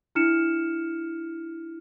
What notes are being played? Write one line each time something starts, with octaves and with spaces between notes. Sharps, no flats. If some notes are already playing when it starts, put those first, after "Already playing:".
D4 E4 F6 C#7 E7